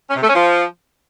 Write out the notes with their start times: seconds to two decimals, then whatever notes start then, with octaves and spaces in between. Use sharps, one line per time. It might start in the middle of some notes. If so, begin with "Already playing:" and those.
0.10 C#4
0.16 C3
0.22 A3
0.28 C#4
0.35 F3